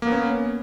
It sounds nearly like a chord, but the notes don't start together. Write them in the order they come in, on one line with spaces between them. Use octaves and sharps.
A#3 B3 C#4